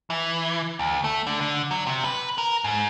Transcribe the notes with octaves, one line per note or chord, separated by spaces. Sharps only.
E3
D2
A3
D3
D3
F#3
C3
B4
A#4
G#2